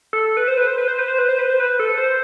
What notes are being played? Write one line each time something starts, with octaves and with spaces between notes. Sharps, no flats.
A4
B4
C5
B4
C5
B4
C5
B4
C5
B4
C5
B4
C5
B4
A4
C5